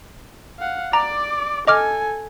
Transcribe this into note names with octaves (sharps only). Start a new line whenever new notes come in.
F5 F#5
D5 A#5 D6
A4 D#5 G#5 D6 F6